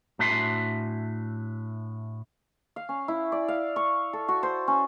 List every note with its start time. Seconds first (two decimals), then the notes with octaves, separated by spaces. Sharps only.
0.19 A2 D4 F#4 E5 G#5 C6
2.76 F5
2.89 C#4
3.08 E4
3.32 D5
3.48 F5
3.76 C#6
4.13 A4
4.28 F#4
4.43 C5
4.68 C#4